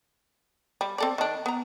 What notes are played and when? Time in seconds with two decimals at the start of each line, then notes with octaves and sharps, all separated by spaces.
0.81 G3
0.98 C4 A4 D5
1.18 D#3 D4
1.46 B3 A#5